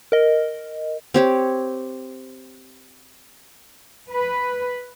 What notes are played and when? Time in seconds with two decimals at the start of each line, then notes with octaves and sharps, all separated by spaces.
0.12 A#4 D#5
1.14 C4 G4 C#5
4.11 B4